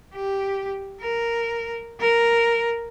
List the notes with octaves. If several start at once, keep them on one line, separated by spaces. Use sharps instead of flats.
G4
A#4
A#4